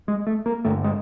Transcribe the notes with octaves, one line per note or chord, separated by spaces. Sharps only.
G#3
A3
A#3
G1 G2 D3 A3
G#3